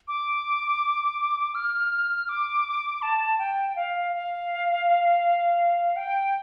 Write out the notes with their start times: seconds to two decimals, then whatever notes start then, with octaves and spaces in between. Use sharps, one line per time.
0.08 D6
1.55 F6
2.29 D6
3.02 A5
3.39 G5
3.76 F5
4.13 F5
5.96 G5